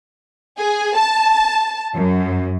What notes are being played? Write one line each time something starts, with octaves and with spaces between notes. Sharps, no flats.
G#4
A5
F#2